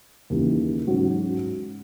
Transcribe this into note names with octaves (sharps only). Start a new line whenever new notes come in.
D#2 C#3 E3
G#2 F#3 C#4 F#4